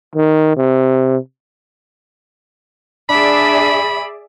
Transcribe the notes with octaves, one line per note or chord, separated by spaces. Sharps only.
D#3
C3
D4 G#4 D5 E5 B5